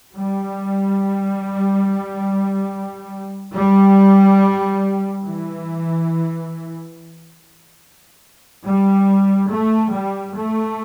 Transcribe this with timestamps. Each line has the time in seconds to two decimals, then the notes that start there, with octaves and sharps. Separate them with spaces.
0.16 G3
3.55 G3
5.25 E3
8.65 G3
9.51 A3
9.92 G3
10.35 A3